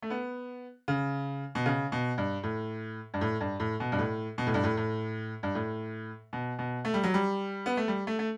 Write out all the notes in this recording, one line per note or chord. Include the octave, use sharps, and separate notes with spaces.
A3
B3
C#3
B2
C#3
B2
G2
A2
G2
A2
G2
A2
B2
G2
A2
B2
A2
G2
A2
A2
G2
A2
B2
B2
A3
G3
F#3
G3
B3
A3
G3
A3
A3